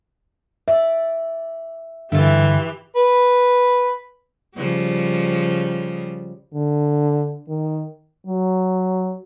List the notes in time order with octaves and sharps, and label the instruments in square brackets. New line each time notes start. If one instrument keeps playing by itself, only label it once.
[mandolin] D5 [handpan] E5
[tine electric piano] G2 D3 [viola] E3 G4 [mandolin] E4 F4
[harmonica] B4
[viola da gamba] C#3 F3 G3
[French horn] D3
D#3
[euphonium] F#3